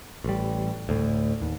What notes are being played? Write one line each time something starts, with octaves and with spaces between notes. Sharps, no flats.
A1 G3
D2 A2
D#2